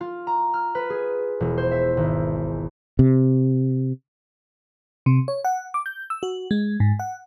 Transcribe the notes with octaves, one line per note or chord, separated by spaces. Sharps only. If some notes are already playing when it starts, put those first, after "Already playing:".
F4
A#5
F6
B4
G#4
E1
C5
E5
G#1
C3
C3
C#5
F#5
D6
G6
E6
F#4
G#3
G#2
F#5